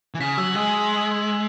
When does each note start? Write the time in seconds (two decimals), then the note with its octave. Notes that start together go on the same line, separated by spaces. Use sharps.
0.14 E3
0.20 C#3 B6
0.37 F#3 E6
0.55 G#3 E6